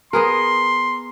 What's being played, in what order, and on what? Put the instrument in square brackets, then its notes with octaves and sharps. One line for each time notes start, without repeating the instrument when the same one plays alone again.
[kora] B3 G#4 A#4 [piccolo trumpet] C6